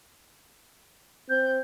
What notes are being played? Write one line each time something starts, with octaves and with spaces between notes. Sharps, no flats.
C4 G6